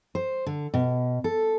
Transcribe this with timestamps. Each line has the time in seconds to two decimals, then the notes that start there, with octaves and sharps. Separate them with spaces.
0.15 C5
0.46 D3
0.74 B2
1.24 A4